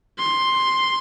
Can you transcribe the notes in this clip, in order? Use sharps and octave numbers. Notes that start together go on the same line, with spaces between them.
C6